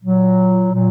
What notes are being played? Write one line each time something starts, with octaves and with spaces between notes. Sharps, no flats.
A#2 F#3
A#2 F#3